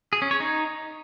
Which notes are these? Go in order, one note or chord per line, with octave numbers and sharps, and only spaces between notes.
G#4
C#4
C#5
D#4